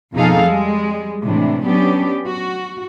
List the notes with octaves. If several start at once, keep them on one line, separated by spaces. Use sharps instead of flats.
F2 B2 D#4 G#4 A4 F5
G3 G#3
A2 C3 E3 D4
F#3 B3 C#4 D4 G4
F#4